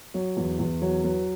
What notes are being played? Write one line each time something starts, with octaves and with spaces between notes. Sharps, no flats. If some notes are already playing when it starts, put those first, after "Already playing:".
F#3 C#5
E2
E2
F#3 C#5
F#3 B4